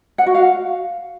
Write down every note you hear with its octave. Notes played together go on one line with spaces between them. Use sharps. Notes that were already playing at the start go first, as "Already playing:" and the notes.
F#5
F#4
F5